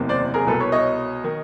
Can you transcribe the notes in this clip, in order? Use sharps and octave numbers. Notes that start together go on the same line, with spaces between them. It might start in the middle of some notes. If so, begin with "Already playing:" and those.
Already playing: F#1 E2 C3 D#3
C5 D5
G#4 A#4
C2 B2 A4 B4
B4 C#5
C#5 D#5
D#3